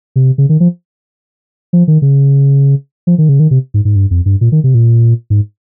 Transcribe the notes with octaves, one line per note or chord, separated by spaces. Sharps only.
C3
C#3
D#3
F3
F3
D#3
C#3
F3
D#3
C#3
D#3
C3
G#2
G#2
G2
F2
G2
A#2
D#3
C3
A#2
G#2